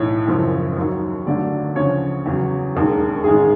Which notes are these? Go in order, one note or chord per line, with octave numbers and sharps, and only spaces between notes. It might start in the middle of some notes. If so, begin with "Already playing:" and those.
Already playing: B1 A2 E3 C#5
G#1 F#2 C#3 F3
D#2 D#3 F#3
G1 G2 D3 F#3 A3 D5
D2 C#3 F3 C#5
E2 C#3 F#3
E1 D#2 D#3 G#3
A1 G#2 D#3 G#3 G#4